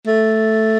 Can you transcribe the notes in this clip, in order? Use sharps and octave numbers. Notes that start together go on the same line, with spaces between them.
A3